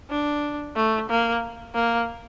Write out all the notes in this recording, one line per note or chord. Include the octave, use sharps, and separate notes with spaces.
D4
A3
A#3
A#3